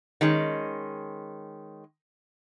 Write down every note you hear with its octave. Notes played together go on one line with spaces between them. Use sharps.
D#3 G#3 C#4